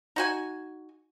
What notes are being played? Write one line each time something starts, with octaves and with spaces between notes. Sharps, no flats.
D#4 F#4 G#5